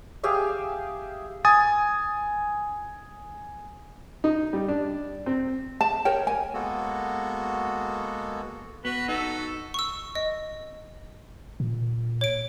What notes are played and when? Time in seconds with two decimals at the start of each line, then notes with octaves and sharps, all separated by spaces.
0.23 G4 G#4 E5 F5
1.45 G#5 D#6 A6
4.24 D#4
4.53 G3
4.68 D4
5.26 C4
5.81 A5
6.05 A#4 C#5 G5
6.27 G#5
6.54 G#3 A#3 B3 F#4 A4
8.85 B3 F#4 B4
9.08 D#4 A4
9.74 C#6 E6
10.15 D#5
11.60 A#2
12.21 C#5 D7